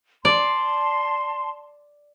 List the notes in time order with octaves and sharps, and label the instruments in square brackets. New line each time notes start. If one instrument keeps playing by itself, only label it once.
[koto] D5 [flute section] A5 C6